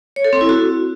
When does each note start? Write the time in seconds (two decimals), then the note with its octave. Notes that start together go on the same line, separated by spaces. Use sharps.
0.16 C#5
0.25 A4
0.33 C4
0.41 E4
0.49 F#4